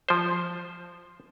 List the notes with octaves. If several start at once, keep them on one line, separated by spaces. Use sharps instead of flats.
F3 C5